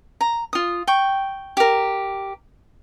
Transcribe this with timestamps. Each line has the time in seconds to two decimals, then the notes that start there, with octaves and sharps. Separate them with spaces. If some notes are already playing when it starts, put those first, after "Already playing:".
0.21 A#5
0.53 F4 D#6
0.87 G5 C#6
1.57 G4 A#4